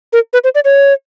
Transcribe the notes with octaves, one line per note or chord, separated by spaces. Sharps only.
A#4
B4
C5
D5
C#5